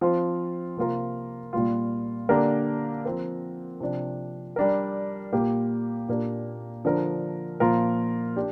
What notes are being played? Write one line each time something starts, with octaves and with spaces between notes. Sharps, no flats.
F3 C4 F4
C3 A#3 F4 A#4
A#2 G3 A#3 F4
D3 A#3 D4 G4 A#4
F3 C4 A#4
C3 F3 D4
G3 D4 A#4
A#2 A#3 G4
A#2 A#3 D4 G4
D3 F3 D4 A#4
A#2 F3 A#3 F4 A#4
D4 G4